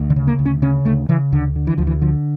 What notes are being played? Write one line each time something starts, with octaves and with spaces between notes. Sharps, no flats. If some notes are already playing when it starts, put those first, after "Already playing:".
Already playing: D2
D3
C#3
A#3
D2
C#4
C#3 C#4
D2 A3
C#3 E3
D2 D3
D3
E3
D2 F3
E3
D3 F3